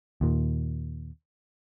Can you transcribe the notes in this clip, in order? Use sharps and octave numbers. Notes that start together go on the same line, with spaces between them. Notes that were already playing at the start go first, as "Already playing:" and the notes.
D#2 A#2